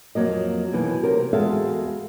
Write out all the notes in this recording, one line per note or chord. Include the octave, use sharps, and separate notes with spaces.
F2 F#3 A#3 D#5
B2 D#3 E3 A#3
C3 F#3 A#4
E2 G#3 F#4 A4 E5 F5